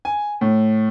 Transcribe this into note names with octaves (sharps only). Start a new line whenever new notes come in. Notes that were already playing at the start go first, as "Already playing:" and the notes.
G#5
A2